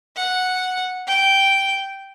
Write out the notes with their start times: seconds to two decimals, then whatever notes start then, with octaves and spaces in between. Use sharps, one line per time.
0.17 F#5
1.08 G5